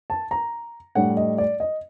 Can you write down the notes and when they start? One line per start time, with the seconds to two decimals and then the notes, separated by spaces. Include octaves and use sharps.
0.10 A5
0.31 A#5
0.95 A2 G3 D4 F#5
1.17 D#5
1.38 D5
1.60 D#5